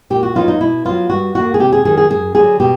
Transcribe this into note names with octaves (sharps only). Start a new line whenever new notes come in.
A#2 G4
F#4
F#3 B3 D#4 F4
D#4
B2 E4
F#3 B3 F4
G2 F#4
D3 G3 A#3 F#4
G#4
C3 G4
G#4
D#3 F#3 G#4
G#4
F#2 G#4
D3 F#3 G#4
B2 G4